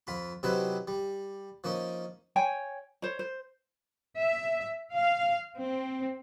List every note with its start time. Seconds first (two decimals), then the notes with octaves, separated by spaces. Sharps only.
0.07 F2 F4 B5
0.43 C3 F#3 C4 D#4 E4 B4
0.88 G3
1.64 F3 A#3 C#4 D#4
2.36 C#5 G5 G#5
3.02 C5 C#5
3.19 C5
4.18 E5
4.93 F5
5.61 C4